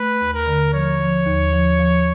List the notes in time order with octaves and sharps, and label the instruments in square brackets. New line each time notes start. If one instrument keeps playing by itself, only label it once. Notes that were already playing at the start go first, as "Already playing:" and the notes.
Already playing: [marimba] A3 [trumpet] B4
[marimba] D#2
[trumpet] A#4
[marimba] D3
[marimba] F3 [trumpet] C#5
[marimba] F3
D#2
F3
F3